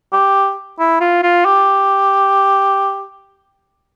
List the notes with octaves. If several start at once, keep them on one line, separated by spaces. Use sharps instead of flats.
G4
E4
F4
F4
G4